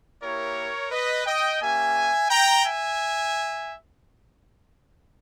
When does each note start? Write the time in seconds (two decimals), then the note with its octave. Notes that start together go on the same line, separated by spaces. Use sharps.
0.23 A#3 E4 G4 A#4 C#5
0.92 B4 D#5
1.26 D#5 G5
1.61 A#3 C#4 G4 E5 G#5
2.30 G5 A#5
2.66 E5 G#5